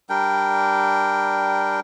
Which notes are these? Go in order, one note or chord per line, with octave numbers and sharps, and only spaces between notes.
G3 D4 A#4 G5